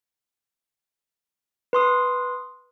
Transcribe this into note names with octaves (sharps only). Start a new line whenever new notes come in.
B4 C6 D#6